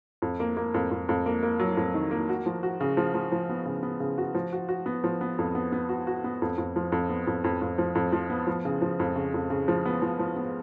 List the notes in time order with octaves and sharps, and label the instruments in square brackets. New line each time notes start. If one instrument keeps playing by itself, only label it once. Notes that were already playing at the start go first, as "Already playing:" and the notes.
[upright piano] F2
A#3
A#3
F2
F2
F2
A#3
A#3
F#3
F2
D#3
A#3
F#4
F3
F#4
C#3
F3
F3
F3
B3
C#3
B3
C#3
F#4
F3
F#4
F#4
B3
F3
B3
F2
B3
B3
F#4
F#4
B3
F2
F2
F3
F2
B3
F2
F2
F2
F3
F2
F3
B3
F3
C#3
F3
F2
C#3
F2
C#3
F3
B3
F3
F3
B3